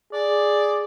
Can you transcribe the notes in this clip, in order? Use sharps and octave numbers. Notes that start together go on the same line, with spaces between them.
G#4 D5